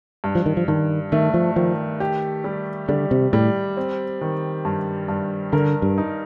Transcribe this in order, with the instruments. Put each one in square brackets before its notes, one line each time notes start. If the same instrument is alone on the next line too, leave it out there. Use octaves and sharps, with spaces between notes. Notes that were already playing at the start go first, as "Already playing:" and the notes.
[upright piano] G2
[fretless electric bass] F3
D#3
F3
[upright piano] G2 [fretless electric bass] D#3
[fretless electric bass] D#3 [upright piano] A3
[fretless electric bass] F3
[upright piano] D#3 [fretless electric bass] F3
[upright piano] G4
G3
[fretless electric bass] D3 [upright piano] G3
[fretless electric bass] C3
[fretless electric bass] A2 [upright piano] G3
[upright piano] C4
D#3
G2
G2
[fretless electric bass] D3 [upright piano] A#4
[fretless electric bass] G2
[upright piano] D#4